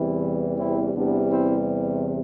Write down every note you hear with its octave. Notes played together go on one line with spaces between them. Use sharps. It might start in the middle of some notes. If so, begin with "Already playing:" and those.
Already playing: E2 C3 E3 G3 C4 E4
C4 E4
E2 C3 E3 G3 B3 D4
C4 E4